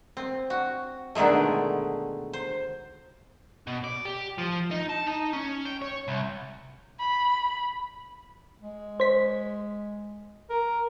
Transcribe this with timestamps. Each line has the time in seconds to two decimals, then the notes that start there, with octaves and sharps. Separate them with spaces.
0.17 C4
0.50 F#4
1.15 B2 D3 D#3 G#3 A3
2.33 C5
3.67 B2
3.84 D5
4.05 G4
4.38 F3
4.71 D#4
4.89 A5
5.07 D#4
5.33 C#4
5.65 G5
5.82 C#5
6.08 C2
7.00 B5
8.62 G#3
9.00 C5 B6
10.50 A#4